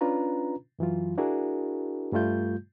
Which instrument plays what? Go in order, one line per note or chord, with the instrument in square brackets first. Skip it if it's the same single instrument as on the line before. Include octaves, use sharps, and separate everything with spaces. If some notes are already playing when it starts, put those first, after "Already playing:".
[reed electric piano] C#4 D4 F4 B4 A#5
F#2 E3 F#3 F4
D4 E4 F#4 G#4 A#4
G2 G3 A3 F4 G6